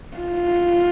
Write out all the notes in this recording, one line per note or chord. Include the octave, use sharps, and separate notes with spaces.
F4